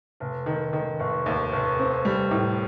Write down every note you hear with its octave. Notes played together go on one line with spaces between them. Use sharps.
F1
D#3
D#3
F1
D#2
F1
C4
G3
A2